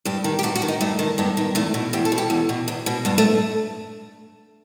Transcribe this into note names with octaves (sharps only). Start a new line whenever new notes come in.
G2 G4
D#3
G4
G2 F#4
F#4
D#3
D#4
G2 A3
D#3
G2 B3
D#3
E2 A3
B2
E2 G4
A4
B2
G4
E2
B2
E2
B2
G2 B3
A3